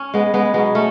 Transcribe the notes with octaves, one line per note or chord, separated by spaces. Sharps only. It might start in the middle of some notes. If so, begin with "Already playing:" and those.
Already playing: C#4
G#3 B3
G#3 B3
B2 F#3 G#3 B3
A3 C#4